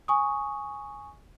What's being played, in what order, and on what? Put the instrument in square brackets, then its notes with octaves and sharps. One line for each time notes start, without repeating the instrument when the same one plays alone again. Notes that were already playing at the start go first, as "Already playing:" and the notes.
[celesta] G#5 C#6 D#6